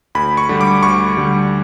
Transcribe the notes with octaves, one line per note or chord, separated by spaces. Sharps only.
D2 B5
C#6
D3 G3
D6
D2 C#6
D3 G3